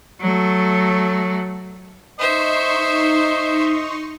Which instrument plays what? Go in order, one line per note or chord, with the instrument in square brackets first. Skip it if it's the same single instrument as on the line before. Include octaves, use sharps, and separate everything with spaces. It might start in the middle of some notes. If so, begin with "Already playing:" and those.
[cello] F#3 A3
[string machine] D#4 C6 C#6 [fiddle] C5 E5 [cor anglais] D#5